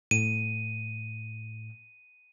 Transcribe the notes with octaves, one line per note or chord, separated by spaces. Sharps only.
A2 D#7